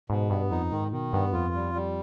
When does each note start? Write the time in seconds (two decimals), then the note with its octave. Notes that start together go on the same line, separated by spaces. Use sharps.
0.10 G#2 B2
0.30 G2 B3
0.51 F2 D#4
0.71 G#2 D#3
0.92 B2 D#3
1.13 G2 B3
1.33 F2 F4
1.55 G3
1.74 G3